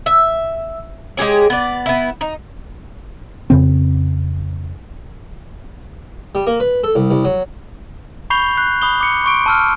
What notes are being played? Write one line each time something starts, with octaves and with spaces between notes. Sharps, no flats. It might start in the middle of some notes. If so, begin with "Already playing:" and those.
E5
G#3 G4 G#4 C#5
B3 D5
B3 E4
D#4
F2 C#3 C4
G3
A#3
B4
A4
C2
C2
F#3
B5 C#6 G6 C7 F7 G7
F#6 C7
B5 D#6 G7
D6 C#7
C6 C#6 D7
A5 E6 F6